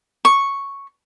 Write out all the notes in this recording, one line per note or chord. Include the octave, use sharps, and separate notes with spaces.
C#6